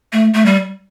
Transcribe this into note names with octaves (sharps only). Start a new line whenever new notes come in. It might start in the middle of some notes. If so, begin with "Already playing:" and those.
A3
A3
G3